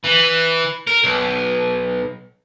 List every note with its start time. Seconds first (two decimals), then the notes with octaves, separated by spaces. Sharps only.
0.05 E3
0.87 A#4
1.04 B1